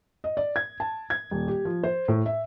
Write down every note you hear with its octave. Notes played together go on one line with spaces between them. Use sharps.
D#5
D5
G#6
A5
G#6
D#1
G4
F3
C5
A2
E5